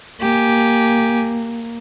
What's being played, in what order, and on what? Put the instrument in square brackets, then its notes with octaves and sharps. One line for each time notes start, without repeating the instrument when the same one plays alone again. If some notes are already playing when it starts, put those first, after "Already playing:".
[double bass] A#3 [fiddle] G4 G#5